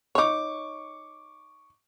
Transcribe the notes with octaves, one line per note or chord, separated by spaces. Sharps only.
D#4 C#5 C#6 D6